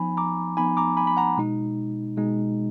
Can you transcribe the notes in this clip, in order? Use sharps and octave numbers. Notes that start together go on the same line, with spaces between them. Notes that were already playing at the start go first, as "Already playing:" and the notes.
Already playing: F3 B3 D#4 G#5 B5
A#5 D6
F3 B3 D#4 G#5 B5
A#5 D6
G#5 B5
B5
F#5 A#5
B2 G#3 D#4
B2 G#3 D#4